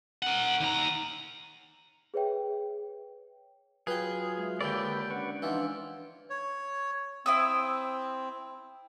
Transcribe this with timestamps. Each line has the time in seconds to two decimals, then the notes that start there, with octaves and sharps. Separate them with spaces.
0.22 A#4 F#5
0.61 D#2 A#5
2.14 G#4 B4 C#5 E5 G5
3.87 F#3 F4 G#4 B4 G5 F6
4.38 G#3 E5
4.61 D#2 D3 B4 C#5 D5 G5 B5
5.10 C#4 D4 B4 F#5 C#6
5.42 E3 F3 D4 D#4 E5 F#5
6.30 C#5
7.26 C4 E4 D#6 E6